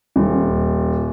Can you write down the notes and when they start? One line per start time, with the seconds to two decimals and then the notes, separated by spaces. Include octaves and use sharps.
0.16 D#1